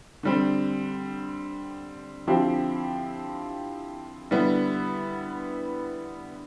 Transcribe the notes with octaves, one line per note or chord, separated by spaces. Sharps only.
D3 G3 C4
D3 F3 C4 E4 G4
D3 G3 B3 E4